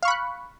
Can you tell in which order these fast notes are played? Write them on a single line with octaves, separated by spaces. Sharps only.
F5 C#6 B5 F#6